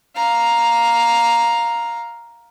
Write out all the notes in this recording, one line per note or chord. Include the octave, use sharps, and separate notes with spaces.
F5 A#5